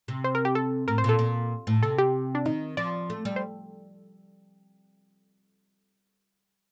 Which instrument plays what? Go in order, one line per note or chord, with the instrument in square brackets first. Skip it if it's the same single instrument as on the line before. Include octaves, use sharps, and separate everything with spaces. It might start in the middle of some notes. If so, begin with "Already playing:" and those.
[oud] C3
[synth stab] C5
A#4
G4
A4
[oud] A2 [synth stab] A#4
[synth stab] C5
[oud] A#2
[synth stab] A4
[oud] A#2
A2
[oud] C3 [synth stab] A4
[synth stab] G4
D4
[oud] D#3 [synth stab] D#4
[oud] F3 [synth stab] D5
[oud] A3
G3
[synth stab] C5